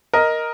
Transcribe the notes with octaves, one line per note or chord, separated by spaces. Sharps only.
A#4 D#5